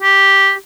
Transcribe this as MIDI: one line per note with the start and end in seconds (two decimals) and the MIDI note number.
0.02 0.53 67